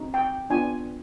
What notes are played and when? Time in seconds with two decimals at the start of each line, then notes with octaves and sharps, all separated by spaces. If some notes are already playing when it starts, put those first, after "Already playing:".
Already playing: C4 D#4 F#4
0.14 G5
0.50 B3 D4 F4 G#5